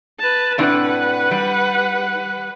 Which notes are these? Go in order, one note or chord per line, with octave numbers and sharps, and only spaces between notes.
B4 A5
A2 C3 D4 B4 F#5
G3